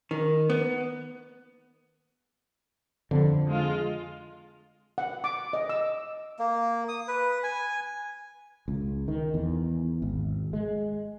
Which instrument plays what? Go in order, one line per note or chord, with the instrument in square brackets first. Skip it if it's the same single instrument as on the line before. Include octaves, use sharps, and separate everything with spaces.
[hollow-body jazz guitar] D#3
B3
[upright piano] F2 [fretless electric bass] D3
[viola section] G#3 F4
[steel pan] F#5
D6
D#5
E6
[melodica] A#3
D#6
B4
G#5
[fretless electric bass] C#2
D#3
E2
G#1
G#3